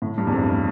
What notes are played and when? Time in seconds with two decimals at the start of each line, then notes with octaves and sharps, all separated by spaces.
0.02 A2
0.18 G2
0.27 E2
0.32 F2